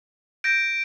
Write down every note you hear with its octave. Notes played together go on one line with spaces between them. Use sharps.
G6 A#6 D7